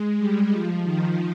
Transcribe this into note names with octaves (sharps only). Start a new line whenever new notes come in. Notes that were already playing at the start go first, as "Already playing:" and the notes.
Already playing: G#3
G3
F3
D#3